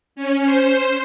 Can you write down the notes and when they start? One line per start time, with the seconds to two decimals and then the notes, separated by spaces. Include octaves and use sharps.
0.16 C#4
0.45 C5